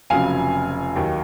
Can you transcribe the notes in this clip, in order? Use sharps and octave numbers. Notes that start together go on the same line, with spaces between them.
F1 F2 C#3 F#3 F5 G#5
D#2 D#3 F#3